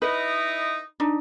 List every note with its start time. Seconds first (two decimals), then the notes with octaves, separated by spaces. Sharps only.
0.02 D#4 E4 B4 D#5
1.00 D4 D#4